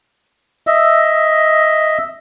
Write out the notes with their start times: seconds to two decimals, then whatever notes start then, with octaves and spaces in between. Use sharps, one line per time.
0.67 D#5 E5